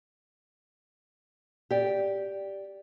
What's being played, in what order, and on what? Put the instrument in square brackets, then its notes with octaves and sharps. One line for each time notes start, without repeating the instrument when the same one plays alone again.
[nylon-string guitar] G4 D5